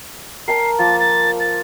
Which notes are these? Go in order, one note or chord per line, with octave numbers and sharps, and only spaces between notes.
A#4 G5 A5 C7
F3 A#3 A6
A6
A6